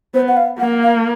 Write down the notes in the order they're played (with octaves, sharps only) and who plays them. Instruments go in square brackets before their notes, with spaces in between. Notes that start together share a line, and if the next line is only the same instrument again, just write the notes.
[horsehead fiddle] B3 [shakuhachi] C5
[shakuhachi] F#5
F5
[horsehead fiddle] A#3 [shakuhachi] F#5
[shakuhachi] F5